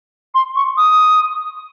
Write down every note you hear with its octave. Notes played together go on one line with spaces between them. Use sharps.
C6
C#6
D#6